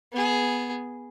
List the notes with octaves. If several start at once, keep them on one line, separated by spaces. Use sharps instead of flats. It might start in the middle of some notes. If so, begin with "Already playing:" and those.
B3 G#4